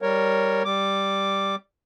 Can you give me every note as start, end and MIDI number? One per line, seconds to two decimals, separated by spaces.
0.02 0.63 55
0.02 0.63 70
0.02 0.63 73
0.65 1.55 55
0.65 1.55 86